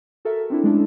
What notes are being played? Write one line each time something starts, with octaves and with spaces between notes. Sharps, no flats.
F#4 A4 A#4 E5
C4 D4 E4
G#3 A3 C#4 D4 E4 A4